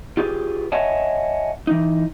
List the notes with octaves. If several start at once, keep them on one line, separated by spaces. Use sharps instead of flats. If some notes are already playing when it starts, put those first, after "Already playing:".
F4 G4 G#4 B4
C#5 D#5 E5 F#5 G#5 A5
E3 D#4